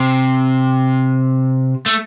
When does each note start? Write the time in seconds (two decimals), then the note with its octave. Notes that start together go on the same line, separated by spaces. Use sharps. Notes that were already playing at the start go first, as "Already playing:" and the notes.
Already playing: C3
1.86 A3